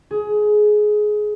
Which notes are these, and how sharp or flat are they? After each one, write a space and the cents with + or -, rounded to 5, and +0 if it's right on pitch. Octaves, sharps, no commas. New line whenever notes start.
G#4 +20